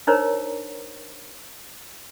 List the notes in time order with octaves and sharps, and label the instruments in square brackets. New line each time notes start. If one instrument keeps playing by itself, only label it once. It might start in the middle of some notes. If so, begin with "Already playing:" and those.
[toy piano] D4 D#4 A#4 C5 C#5 A#5